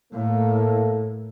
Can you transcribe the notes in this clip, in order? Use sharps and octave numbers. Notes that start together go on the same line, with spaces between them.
A2 A3 A#3 A4